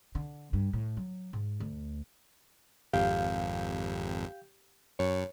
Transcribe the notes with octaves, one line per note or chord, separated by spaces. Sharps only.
D3
G2
A2
F#3
G#2
D2
G#1 F2 G4 F5
F#2 C#5